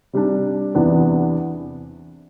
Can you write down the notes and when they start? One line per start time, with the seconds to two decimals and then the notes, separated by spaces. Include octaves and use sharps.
0.13 C3 G3 D4
0.75 E2 C3 E3 B3 D4